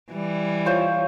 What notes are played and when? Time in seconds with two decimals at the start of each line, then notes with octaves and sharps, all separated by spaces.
0.12 E3 G3
0.66 F4 C5 C#5